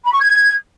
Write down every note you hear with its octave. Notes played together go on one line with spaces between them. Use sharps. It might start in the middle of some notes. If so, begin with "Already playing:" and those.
B5
C#6
G#6